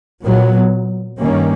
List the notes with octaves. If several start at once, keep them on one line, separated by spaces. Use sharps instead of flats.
A#2 F#3 B3
G2 D#3 G3 A#3 C#4